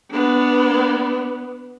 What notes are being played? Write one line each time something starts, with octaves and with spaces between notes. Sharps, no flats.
B3 D4